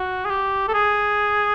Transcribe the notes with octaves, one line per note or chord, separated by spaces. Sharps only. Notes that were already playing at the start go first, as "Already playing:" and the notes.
Already playing: F#4
G#4
G4
A4
G#4